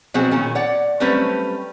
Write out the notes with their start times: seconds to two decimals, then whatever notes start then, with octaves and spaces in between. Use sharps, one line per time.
0.14 B2 F3 F#3 C4 F#4 G#4
0.31 A#2 D#3 C#4
0.55 C#5 D5 F#5
1.00 F#3 G3 A3 C4 C#4 B4